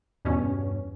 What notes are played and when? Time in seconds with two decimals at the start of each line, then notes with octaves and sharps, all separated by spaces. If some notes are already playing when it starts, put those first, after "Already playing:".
0.25 E2 G2 B2 C#4